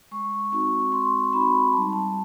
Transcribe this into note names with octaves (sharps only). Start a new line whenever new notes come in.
G#3 C#6
C4 D#4 F#4 C#6
G#3 C6
C4 D#4 F#4 B5
G3 A5
A5